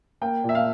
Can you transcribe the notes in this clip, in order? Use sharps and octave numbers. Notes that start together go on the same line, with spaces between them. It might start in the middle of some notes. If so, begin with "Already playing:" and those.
A#3 G5
A#2
E5
F5